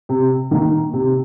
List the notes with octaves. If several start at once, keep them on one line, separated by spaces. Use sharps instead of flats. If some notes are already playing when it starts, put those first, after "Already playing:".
C3
D#3 A#3
C3